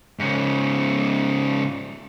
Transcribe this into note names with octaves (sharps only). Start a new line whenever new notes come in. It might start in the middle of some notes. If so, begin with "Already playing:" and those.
G#2 C#3